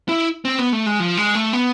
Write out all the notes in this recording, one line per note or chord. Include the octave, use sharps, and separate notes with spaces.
E4
C4
B3
A3
G#3
F3
G#3
A3
B3